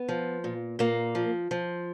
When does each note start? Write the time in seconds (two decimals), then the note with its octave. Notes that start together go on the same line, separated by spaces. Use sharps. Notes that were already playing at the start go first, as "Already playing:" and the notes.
Already playing: B3
0.08 F3
0.44 A#2
0.79 A#2 A#3
1.15 F3
1.51 F3